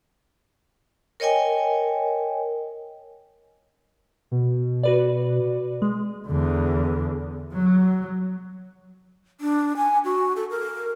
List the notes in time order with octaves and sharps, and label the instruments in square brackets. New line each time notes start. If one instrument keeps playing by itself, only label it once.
[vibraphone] A#4 C#5 D#5 G5 G#5
[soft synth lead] B2
[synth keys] F#4 B4 D5
G#3
[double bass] E2 D3
F#3
[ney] D4
G#5
F#4
A4
A#4